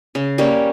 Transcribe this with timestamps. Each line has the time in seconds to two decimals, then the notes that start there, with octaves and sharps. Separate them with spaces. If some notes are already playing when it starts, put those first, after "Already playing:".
0.15 C#3
0.38 G3 A#3 C#4